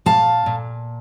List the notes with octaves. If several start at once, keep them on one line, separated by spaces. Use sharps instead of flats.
A#2 F5 A5
A#2